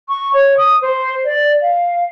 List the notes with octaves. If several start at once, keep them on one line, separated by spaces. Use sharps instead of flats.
C#6
C#5
D#6
C5
D5
F5